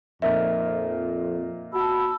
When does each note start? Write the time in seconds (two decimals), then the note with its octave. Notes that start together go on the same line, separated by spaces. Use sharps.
0.22 F2 A#2 D#4 A#4 E5
1.74 F#4 A5 B5 E6